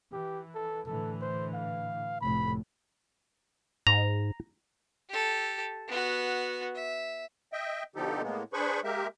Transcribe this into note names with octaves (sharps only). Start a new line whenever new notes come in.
E3 G4
A4
A2 D3 E3 A4
C5
F5
F1 A2 B5
G#2 A#5
G4 A4
B3 F#4
E5
D#5 E5 G5
B2 D3 F3 D#4 G4 A4
A2 G#3 A#3 B3
D4 G#4 B4 C5 B5 C#6
G#3 A#3 G4 A#4 E5